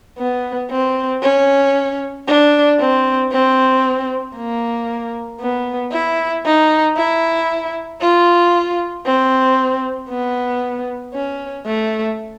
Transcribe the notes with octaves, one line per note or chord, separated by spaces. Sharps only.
B3
C4
C#4
D4
C4
C4
A#3
B3
E4
D#4
E4
F4
C4
B3
C#4
A3